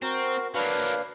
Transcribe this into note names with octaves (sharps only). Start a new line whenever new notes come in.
C4 F#4 A#4
F#3 A#3 D4 B4 F5